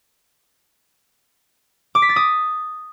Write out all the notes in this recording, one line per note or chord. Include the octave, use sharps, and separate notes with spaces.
D6
B6
A6
D#6